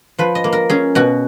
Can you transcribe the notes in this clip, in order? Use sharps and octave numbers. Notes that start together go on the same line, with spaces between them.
F3 B4
D#5
A#3
A#4
C#4 G#4
B2 F#4